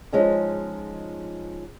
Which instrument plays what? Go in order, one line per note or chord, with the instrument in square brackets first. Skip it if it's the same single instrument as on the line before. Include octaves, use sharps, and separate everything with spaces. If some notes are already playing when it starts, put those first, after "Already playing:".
[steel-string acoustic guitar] F3 G#3 C#4 D#4